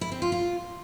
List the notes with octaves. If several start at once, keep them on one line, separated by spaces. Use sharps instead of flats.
E4
C4
F4
F4